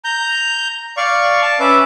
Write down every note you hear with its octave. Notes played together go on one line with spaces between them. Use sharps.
A#5 G6
D5 F5 C#6
A5
C#4 B4 E5 D6